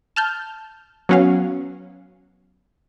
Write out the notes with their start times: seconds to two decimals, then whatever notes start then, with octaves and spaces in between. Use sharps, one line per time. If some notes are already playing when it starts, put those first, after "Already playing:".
0.16 A5 F6 G6
1.09 F#3 B3 C#4 F#4 F5